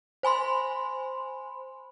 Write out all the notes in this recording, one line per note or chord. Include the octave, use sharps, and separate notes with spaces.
C5 G#5 B5 C6